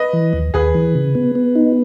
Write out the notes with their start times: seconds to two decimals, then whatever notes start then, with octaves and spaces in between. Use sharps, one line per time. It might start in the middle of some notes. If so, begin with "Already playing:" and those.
Already playing: B4 D#5
0.13 E3
0.33 D#2
0.54 D#2 G#4 B4
0.74 E3
0.95 C#3
1.15 B3
1.35 B3
1.55 D#4